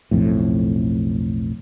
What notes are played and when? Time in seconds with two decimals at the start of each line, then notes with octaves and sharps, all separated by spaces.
0.11 B1 F2 A2